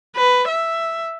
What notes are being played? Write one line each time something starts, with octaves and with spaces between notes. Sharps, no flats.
B4
E5